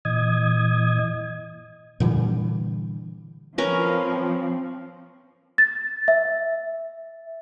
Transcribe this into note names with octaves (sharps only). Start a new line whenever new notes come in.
A#2 E3 D#5 D#6 G#6
A#2 D3 E3 G3
F3 C4 C#4 A#4 B4
A6
E5